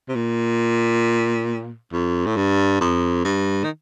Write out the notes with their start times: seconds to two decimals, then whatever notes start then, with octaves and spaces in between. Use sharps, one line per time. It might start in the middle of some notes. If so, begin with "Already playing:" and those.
0.08 C3
0.15 A#2
1.93 F2
2.26 A2
2.36 G2
2.81 F2
3.25 G2
3.64 D#3